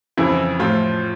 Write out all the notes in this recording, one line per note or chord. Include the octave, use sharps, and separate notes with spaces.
F2 C#3 E3 E4
A2 F3 F4